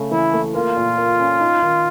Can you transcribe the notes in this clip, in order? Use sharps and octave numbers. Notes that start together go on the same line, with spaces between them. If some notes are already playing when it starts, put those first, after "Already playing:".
Already playing: C#3 A3
E3 E4
A3
A#3 F4
A#2
A#3
C#4
D#4
D#3